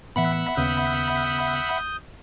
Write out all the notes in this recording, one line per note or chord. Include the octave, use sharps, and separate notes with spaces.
A2 E3 B3 E5 F#5 B5
D#2 C#3 B3 D#6 G6